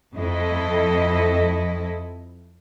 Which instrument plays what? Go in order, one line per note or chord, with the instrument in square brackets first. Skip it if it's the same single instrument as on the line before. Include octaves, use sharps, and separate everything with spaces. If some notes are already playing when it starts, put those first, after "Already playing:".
[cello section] F2 E4 A4 D#5